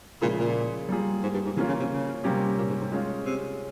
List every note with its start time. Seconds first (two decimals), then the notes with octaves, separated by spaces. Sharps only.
0.21 A#2 C#3 F3 G#3 E4 G#4
0.39 A#2
0.89 G3 A#3 F4 G#4
1.23 G#2
1.34 G2
1.46 G#2
1.57 C3 E3 A#3 C#4 F4
1.68 C#3
1.79 C3
1.91 C#3
2.24 C3 G3 A#3 C#4 G4
2.58 A#2
2.69 G#2
2.81 G#2
2.92 G#3 C#4 F4
3.25 C3